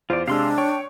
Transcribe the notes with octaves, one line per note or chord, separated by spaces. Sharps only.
E2 F4 C5 D5
C3 G#3 D4 F5 C6 E6
C#5 G5 C#6